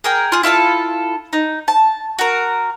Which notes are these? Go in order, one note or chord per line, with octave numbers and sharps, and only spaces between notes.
G#4 A#4 G5
F4 G#4
E4 F4 A4 A5
D#4
A5
F#4 A#4